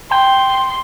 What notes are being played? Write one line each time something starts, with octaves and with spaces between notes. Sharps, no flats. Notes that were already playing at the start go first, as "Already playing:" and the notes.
G5 C6